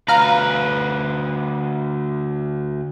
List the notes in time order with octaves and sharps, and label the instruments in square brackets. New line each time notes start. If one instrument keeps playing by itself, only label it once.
[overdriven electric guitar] D2 B4 [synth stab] F5 A#5